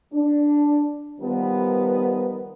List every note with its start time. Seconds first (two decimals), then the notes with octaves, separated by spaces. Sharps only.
0.13 D4
1.20 D#3 F3 G3 B3 A#4 B4